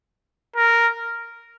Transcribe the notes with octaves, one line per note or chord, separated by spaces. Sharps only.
A#4